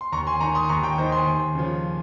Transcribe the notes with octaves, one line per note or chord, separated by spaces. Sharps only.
C6
D#2 A#5 C#6
G#5 C6
D#3 A#5 C#6
C6 D#6
D#2 A#5 C#6
G5 A#5
D#3 C5 D#5
G#5 C6
D#2
C#3 F3